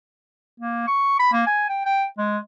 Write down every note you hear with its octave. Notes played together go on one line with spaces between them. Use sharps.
A#3
C#6
B5
A#3
G#5
G5
G5
G#3